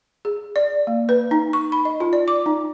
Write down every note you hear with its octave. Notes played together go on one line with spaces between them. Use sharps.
G#4
D5
A#3
B4
D#4
C#6
B5
D#5
F4
D5
D6
D#4